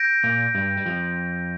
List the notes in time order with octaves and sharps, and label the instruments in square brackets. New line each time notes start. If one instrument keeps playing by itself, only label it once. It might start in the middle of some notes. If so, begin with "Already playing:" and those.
Already playing: [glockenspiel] G6 A#6 D7
[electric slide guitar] A#2 A#3
G2 G3
G3
F2 F3